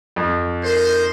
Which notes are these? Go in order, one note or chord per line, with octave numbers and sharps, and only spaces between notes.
F2
D#4 A#4 C5